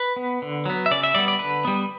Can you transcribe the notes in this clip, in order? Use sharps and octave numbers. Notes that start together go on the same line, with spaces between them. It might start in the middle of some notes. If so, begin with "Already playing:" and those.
Already playing: B4
B3
D3
F#3 B3
E5
C#3 D5
E5
G3 B3 D5
D5
D3 B4
G3 B3